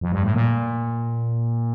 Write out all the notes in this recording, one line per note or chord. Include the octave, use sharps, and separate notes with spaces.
F2
G2
A2
A#2